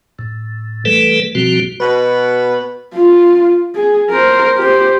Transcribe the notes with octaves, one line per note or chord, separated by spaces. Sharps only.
A2
E3 G3 A3 A4 B4
B2 F3 G3 C4 F#4
B2 B4
F4
G#4
A#4 C5
G4 C5